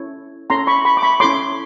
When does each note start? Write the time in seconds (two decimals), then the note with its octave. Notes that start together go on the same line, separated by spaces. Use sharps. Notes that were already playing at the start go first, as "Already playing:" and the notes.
Already playing: C#4 E4 A4 C#5
0.50 C#4 E4 A4 C#5 A#5 C6
0.67 B5 C#6
0.85 B5 C#6
0.97 D6
1.02 B5 C#6
1.20 C#4 E4 A4 C#5 C6 D6